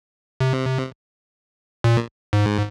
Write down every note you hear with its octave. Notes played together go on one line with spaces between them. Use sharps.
C3
A#2
G#2